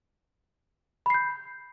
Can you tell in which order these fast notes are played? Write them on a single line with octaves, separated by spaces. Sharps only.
B5 C7 G6